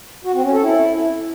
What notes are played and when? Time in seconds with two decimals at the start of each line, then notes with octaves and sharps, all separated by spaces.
0.25 F#4
0.34 C4
0.44 C#4
0.53 A4
0.62 E4